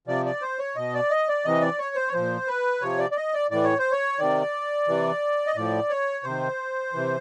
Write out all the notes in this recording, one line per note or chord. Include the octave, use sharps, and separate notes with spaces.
C3 F3 D5
D5
C5
C#5
B2 D#5
D5
D#5
D5
C3 E3 D#5
D5
C#5
C5
C#5
A#2 F3 C5
B4
C3 F3 C#5
D5
D5
D#5
D5
A2 E3 D5
C#5
C5
C#5
C3 D#3 D5
C3 E3
D#5
A2 F3 D5
C#5
C3 D#3 C5
C3 E3